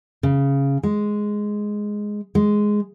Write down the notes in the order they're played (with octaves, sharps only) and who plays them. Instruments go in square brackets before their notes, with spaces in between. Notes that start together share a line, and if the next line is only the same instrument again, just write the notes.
[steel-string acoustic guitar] C#3
G#3
G#3